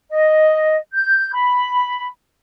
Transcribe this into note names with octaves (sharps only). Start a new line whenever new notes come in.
D#5
G6
B5